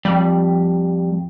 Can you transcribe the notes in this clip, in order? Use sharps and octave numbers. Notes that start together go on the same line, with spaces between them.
F2 G3